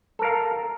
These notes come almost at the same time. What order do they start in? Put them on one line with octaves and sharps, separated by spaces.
A4 A#4 F5